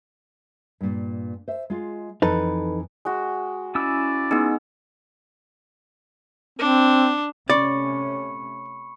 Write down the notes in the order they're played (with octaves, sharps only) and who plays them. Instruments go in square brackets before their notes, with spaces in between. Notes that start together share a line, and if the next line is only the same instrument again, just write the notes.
[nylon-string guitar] G2 A#2
C5 E5
G#3 F4
[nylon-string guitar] F2 E3 [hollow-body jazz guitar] D#4 A4 B4
[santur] G#3 F#4
[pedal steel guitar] C#4 E4 E6 [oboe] D5
[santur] G#3 [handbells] B3 D#4
[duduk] C4 [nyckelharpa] D4
[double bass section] C3 A3 C#4 [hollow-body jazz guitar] D5 [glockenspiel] B5 C#6 C#7